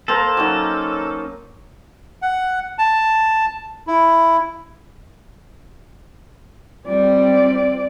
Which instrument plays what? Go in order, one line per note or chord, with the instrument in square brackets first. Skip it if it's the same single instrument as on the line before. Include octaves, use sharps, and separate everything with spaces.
[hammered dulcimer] A#3 C5 A#5 [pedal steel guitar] A4
[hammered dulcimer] F#3 C#4 D#4
[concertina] F#5
A5
E4
[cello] G3 [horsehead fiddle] C4 D5